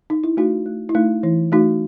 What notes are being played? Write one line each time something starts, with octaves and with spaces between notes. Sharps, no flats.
D#4
E4
A3 D#4 F#4
A3
E4
A3 D#4
E3 E4
A3 D#4 F#4